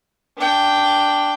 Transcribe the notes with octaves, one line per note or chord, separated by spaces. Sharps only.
D4 G5